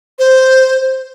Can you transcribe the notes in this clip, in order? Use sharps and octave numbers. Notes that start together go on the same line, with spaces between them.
C5